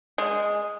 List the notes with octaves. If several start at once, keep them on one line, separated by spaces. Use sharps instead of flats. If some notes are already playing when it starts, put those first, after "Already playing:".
G#3